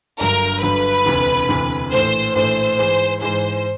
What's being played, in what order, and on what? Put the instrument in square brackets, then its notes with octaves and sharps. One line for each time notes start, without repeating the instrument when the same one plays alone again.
[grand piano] G1 G2 D3 F#3 [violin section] A#4
[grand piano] G1 G2 D3 F#3 [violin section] B4
[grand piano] E1 D2 C3 E3
E1 D2 C3 E3
[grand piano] A#1 A2 E3 A3 [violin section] C5
[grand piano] A#1 A2 E3 A3 [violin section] C5
[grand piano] G#2 E3 G#3
[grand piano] G#2 E3 G#3 [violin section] C5